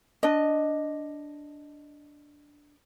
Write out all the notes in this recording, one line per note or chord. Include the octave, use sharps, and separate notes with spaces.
D4 D#5